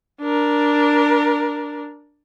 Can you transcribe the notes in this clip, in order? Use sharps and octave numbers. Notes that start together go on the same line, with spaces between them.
D4 A#4